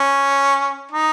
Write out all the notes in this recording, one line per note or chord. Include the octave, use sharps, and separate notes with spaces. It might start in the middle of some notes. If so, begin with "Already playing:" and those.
Already playing: C#4
D#4